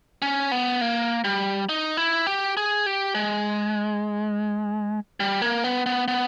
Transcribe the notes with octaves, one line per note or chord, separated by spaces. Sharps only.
C#4
B3
A#3
G3
D#4
E4
G4
G#4
G4
G#3
G3
A#3
B3
B3
B3